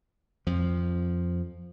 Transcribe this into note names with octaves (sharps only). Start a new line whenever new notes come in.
F2 F3